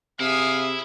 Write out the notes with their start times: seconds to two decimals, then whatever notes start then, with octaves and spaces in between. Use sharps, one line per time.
0.20 C3 E4 G#4 F5 D#6